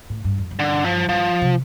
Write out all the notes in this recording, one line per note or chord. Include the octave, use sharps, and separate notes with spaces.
A2
G2
F2
G2
D3
F3
G2 F3
C3